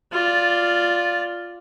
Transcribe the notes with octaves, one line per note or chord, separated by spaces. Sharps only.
F4 D5